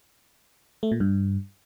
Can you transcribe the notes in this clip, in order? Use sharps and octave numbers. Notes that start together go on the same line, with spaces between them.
A3
A#2
G2